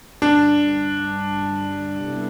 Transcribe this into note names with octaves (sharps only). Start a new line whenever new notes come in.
G2 D3 G3 D4
C3 G3 B3 E4 A4